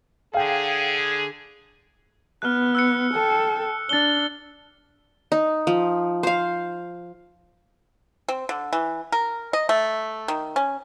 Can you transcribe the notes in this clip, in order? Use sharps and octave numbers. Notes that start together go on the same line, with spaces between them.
D3 G#4 F5 G5
B3 F6 F#6
E6 F#6 C#7
A4 G5
D4 A6 G7
D#4
F3
C5 F5
C4
D3
E3
A#4
D#5
A3
D#3
C#4